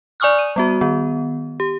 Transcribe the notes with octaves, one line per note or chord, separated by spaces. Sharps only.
D5 G#5 C#6 D#6 F6 F#6
D#7
G3 B3 F#4
D#3 B3
G4